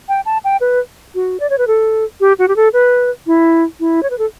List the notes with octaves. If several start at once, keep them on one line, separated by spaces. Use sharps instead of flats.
G5
A5
G5
B4
F#4
D5
C#5
B4
A4
G4
F#4
G4
A4
B4
E4
E4
C#5
B4
A4